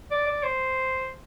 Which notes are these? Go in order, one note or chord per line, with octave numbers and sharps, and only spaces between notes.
D5
D5
C5